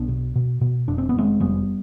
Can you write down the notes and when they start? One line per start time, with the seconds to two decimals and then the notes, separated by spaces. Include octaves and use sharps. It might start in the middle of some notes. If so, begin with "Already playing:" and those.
Already playing: B1 B3 D4
0.08 B2
0.36 B2
0.61 B2
0.88 F1 D4
0.98 C4
1.09 B3
1.14 F1 G#3 C4
1.40 F1 G3 B3